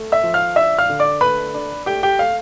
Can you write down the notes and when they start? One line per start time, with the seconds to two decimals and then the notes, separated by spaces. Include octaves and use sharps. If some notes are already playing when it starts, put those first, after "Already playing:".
Already playing: A3
0.12 E5 E6
0.23 F3
0.34 F5 F6
0.56 D4 E5 E6
0.78 F5 F6
0.89 D3
1.00 D5 D6
1.21 A3 B4 B5
1.54 D4
1.86 A3 G4 G5
2.03 G4 G5
2.19 A3 F5